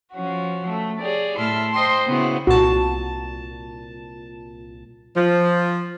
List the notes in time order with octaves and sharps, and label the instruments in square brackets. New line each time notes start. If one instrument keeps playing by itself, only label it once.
[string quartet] F3 C#4 F#4
A3
G4 G#4 C#5 D5
A2 E4 E5 A5 C6 F6
C5 D#5 G5 C6
C#3 B3 E4 F#4 C5
[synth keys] C2 A#2 A5 [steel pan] F#4
[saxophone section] F3